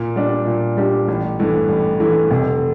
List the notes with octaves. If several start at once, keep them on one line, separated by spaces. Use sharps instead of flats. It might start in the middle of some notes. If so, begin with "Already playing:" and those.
Already playing: A#2
G3 D4 G4
A#2
G3 D4 G4
A1
G2 E3 A3
A1
G2 E3 A3
F1